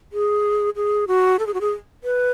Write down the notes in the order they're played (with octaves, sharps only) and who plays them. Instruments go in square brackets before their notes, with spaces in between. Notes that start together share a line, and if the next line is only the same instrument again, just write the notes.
[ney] G#4
G#4
F#4
A4
G#4
F#4
G#4
B4